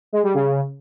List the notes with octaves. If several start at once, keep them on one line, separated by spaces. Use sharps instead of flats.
G#3
G3
C#3